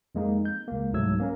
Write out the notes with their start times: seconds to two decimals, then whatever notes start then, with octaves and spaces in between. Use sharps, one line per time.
0.15 F2 G#3 A#3 D#4
0.45 G6
0.68 C#2 A#3
0.93 C2 G#2 F#3 A3 E6 G#6
1.20 A#3 C#4 A#4